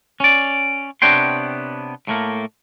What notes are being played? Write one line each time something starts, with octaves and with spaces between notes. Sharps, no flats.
C#4 D5
C3 B3 D4 C#5 G5 C6
A2 A3 A#3